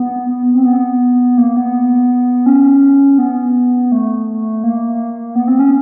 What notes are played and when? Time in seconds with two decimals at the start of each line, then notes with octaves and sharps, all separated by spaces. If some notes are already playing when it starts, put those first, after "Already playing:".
Already playing: B3
0.30 B3
0.54 C4
0.66 B3
1.38 A#3
1.57 B3
2.46 C#4
3.18 B3
3.92 A3
4.64 A#3
5.35 B3
5.48 C4
5.59 C#4